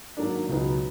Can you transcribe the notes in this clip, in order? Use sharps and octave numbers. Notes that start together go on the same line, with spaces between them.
G#2 D#3 F#3 A#3 D4
C#2 B2 F#3 B3 D#4